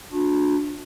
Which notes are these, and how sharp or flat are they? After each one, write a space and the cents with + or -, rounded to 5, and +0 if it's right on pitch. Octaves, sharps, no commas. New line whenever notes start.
D4 +0 F#4 -40